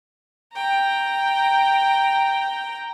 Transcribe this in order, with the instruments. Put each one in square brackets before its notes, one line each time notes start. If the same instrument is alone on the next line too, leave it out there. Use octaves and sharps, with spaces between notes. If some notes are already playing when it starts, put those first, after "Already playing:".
[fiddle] G5 A#5